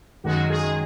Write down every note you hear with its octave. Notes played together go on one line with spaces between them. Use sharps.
F#2 D#3 G#3 F#4
G#4